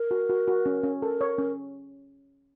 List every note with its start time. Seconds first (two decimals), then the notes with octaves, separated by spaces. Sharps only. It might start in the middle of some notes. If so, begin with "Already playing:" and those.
Already playing: A#4
0.11 F#4
0.29 F#4
0.48 F#4
0.66 C#4
0.84 C#4
1.02 A4 A#4
1.21 C#5
1.39 C#4